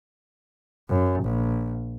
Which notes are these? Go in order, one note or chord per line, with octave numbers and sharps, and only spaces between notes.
F#2
A#1